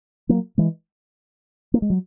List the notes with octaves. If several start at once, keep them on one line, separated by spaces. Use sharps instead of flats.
F#3 A#3
E3 G#3
A#3
G#3
F#3